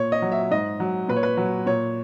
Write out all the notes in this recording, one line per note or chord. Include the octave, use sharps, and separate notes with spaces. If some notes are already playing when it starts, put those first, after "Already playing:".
Already playing: A#2 C#5
D#5
F#3
E5
G#2 D#5
F#3
A#2 B4
C#5
B4
F#3
A#2 C#5